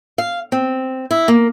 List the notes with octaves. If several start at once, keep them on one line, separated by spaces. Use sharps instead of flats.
F5
C4
E4
A#3